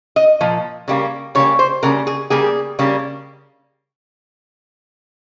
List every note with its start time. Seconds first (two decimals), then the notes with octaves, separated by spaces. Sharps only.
0.16 D#5
0.41 A#2 F3
0.88 C#3 G3 A#3
1.35 C#3 G3 A#3 C#5
1.59 C5
1.83 C#3 G3 A#3 A#4
2.07 G#4
2.30 C#3 G3 A#3 G#4
2.79 C#3 G3 A#3